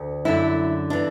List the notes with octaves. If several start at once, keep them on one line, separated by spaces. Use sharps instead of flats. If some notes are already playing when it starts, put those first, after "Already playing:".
Already playing: D2
F#2 D3 E4
E3 D4